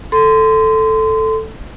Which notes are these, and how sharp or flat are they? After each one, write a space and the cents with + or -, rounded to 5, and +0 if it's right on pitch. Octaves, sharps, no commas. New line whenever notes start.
A4 +0 C6 -25